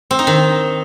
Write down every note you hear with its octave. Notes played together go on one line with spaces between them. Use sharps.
C4
D#4
D#3